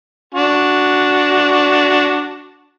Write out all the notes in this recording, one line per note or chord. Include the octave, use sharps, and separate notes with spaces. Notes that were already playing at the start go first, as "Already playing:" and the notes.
D4 F#4